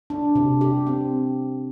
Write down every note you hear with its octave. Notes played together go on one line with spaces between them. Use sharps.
D4
C3
G4
C4